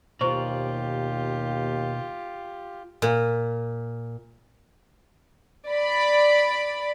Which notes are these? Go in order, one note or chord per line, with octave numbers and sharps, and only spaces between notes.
D#2 B2 F4 G4 C5 D5 A#5 C#6
A#2
D5 B5